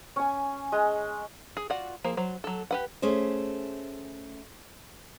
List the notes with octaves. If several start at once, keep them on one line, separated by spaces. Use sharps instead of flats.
C#4 G#5
G#3
G#4
F4 F#4 D5 F#5
F3 A#3 G#4 C5
F#3 C5
F#3 A4
G4 B4 F#5
A3 C#4 G#4 C5